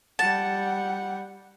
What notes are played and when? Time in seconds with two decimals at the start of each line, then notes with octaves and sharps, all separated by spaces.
0.19 G3 F#5 A5